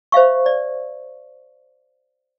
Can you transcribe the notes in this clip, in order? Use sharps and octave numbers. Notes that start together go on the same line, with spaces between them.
C5 E5 F5 C#6
D5